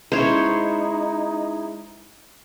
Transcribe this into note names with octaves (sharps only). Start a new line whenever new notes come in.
G#3 C#4 D#4 E4 C5 C#5